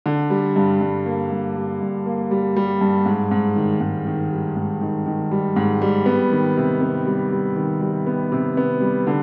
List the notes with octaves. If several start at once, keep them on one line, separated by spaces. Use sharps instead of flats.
D3
G3
G2
G2
A#3
G2
G3
G2
A#3
G3
G3
G2
G#2
G#2
D#3
G#2
D#3
G3
G#2
D#3
D#3
G3
G#2
G3
B3
D#3
C3
B3
G3
G3
D#3
G3
B3
C3
B3
G3
D3